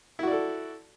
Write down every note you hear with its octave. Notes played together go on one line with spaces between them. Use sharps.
E4 F#4 A4 D5